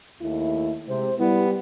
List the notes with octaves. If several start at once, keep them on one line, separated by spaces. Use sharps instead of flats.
D#2 A3 E4
C3 G#3 C5
G3 B3 E4